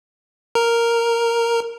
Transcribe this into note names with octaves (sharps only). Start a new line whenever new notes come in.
A#4